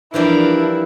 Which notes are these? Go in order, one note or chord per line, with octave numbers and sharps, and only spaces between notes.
E3 F3 G3 D4 E4 A#4